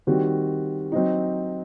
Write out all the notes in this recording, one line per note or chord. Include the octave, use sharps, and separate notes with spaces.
D#3 G3 C4 F#4
F#3 C4 D#4